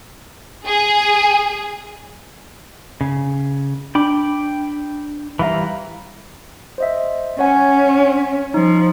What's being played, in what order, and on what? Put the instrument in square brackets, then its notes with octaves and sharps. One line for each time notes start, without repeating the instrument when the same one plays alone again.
[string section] G#4
[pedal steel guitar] C#3
[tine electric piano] D4 [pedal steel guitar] G5 B5 D6
[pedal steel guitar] E3 G3 A#5 [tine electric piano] E5 F5 B5
[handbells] C5 D#5 E5
[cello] C#4 [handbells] C#5 F#5 G#5
[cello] F3 [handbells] D#4